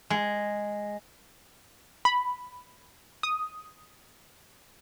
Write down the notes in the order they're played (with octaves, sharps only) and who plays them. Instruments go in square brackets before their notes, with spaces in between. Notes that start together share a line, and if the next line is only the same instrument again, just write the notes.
[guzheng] G#3
[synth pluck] B5
D#6